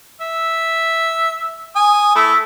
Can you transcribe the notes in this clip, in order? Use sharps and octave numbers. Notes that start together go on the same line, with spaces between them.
E5
G#5 D#6
A3 E4